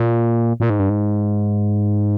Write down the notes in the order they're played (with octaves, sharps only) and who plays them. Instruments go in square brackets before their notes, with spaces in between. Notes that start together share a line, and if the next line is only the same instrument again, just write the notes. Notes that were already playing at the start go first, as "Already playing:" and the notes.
Already playing: [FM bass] A#2
A#2
G#2
G2
G#2